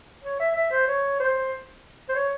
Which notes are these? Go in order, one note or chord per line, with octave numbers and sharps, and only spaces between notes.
C#5
E5
E5
C5
C#5
C5
C5
C#5